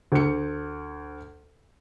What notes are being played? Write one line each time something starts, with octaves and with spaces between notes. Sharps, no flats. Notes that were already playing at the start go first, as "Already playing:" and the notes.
D2 C#7